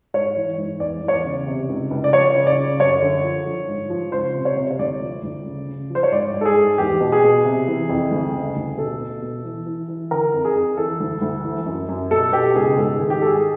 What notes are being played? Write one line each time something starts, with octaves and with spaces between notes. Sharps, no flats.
G#2 C#5
E3
G#2
E2 D5
E2
C#5
D5
C#3
C3
C#2
C#2
D5
F3 C#5
C#3
D5
C#3
F#2 C#5
D3
F3
F3
G#2
F3
C#2 C5
C3
C#5
C3
C#5
D2 D5
F3
D2
C#3
C#3
F3
C5
C#5
G#2 D5
G#2
A4
G#4
G#2
E2 G4
B2
G#4
B2
C3
E3
F2
D2
C#3
D2
B2 A4
B2
B2
E3
E3
E3
D3 A#4
F2
G#4
F2
E3 A4
D2
D2
E3
F#2
F#2
B2 A4
B2 G4
C#2 G#4
G#2 A4
G#4
D#3
G4
G#2 A4
G#4